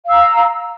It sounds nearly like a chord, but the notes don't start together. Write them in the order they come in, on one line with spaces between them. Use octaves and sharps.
F5 E6 A#5